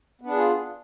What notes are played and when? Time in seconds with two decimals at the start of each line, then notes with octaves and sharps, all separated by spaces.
0.21 B3
0.26 D4
0.31 G#4
0.36 F4